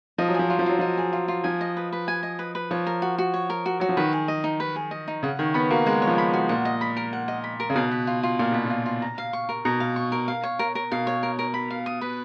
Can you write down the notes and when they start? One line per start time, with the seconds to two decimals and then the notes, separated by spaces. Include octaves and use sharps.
0.18 F3 D#5
0.28 F#3
0.34 F3 G#4
0.48 F#3 F4
0.59 F3
0.66 F#3 F4
0.79 F3 D#5
0.97 G#4
1.13 F4
1.28 F4
1.44 F3 G#5
1.61 D#5
1.77 B4
1.92 B4
2.08 G#5
2.23 D#5
2.39 B4
2.55 B4
2.71 F3 C#5
2.87 A#4
3.02 F#4
3.18 F#4
3.34 C#5
3.50 A#4
3.66 F#4
3.80 F#3 F#4
3.89 F3
3.97 D#3 B4
4.13 G#4
4.28 D#5
4.44 D#4
4.60 B4
4.76 G#4
4.91 D#5
5.08 D#4
5.23 C#3 F#5
5.39 D#3 C#5
5.54 B3 B5
5.70 A#3 F#4
5.86 G#3 F#5
6.02 C#5
6.07 F3
6.18 B5
6.34 F#4
6.49 A#2 F#5
6.65 D#5
6.81 B5
6.97 A#4
7.13 F#5
7.28 D#5
7.44 B5
7.60 A#4
7.70 C#3
7.76 B2 F5
7.91 B4
8.07 F4
8.23 F4
8.39 A#2 F5
8.52 B2 B4
8.65 A#2
8.70 F4
8.86 F4
9.02 A#5
9.18 F5
9.33 C#6
9.49 A#4
9.65 B2 A#5
9.80 F5
9.96 C#6
10.12 A#4
10.28 F5
10.43 C#5
10.59 A#4
10.75 A#4
10.91 B2 F5
11.07 C#5
11.23 A#4
11.39 A#4
11.54 B5
11.71 F5
11.86 D#6
12.01 B4